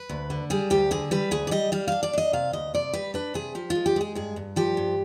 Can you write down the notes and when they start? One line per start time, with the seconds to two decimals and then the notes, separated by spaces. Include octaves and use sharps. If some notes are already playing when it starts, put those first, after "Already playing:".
Already playing: B4
0.09 D2
0.30 D3
0.50 G3 G#4
0.70 D2 G4
0.91 D3 G#4
1.11 G3 B4
1.31 D2 G#4
1.47 D5
1.51 G3 D#5
1.72 G3 F5
1.88 D4 F5
2.03 D5
2.13 D4 D#5
2.33 C3 F5
2.53 D2 D#5
2.74 C3 D5
2.93 G3 B4
3.14 D4 B4
3.34 C3 G#4
3.55 F3 G4
3.70 F4
3.75 G#3
3.86 G4
3.96 G#3 G#4
4.15 G2 G#4
4.36 G2
4.56 F3 G4
4.77 G2